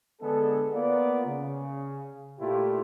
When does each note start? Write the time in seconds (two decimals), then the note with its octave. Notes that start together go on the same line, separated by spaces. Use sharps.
0.22 D3 G#3 B3 D4 G#4 A4
0.73 A#3 B3 F4 D5
1.27 C#3
2.40 A#2 A3 E4 F4 G4